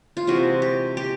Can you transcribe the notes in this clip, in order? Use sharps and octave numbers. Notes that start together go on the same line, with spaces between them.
F4
C3 E3 G#3 F#4
G4
G4